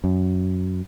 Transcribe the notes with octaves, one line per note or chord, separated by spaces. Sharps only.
F#2